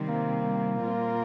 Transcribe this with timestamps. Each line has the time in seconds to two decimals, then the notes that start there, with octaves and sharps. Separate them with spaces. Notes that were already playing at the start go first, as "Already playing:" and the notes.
Already playing: C3 D#3 G3 C4
0.09 A#3
0.82 A#2 G3 C4 F4 A#4